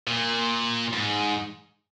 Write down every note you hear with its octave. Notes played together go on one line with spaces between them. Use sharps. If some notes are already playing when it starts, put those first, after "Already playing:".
A#2
G#2